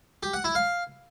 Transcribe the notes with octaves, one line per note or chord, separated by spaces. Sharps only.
G4
F#5
E4
F5